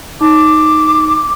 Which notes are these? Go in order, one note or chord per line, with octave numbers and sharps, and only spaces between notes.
D#4 D6